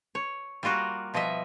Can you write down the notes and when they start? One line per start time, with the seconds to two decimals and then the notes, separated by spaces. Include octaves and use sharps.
0.15 C#5
0.63 G3 A#3 F4 F#4 A#4
1.14 B2 F3 G3 D#5 E5